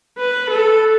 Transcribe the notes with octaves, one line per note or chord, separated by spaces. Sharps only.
B4
A4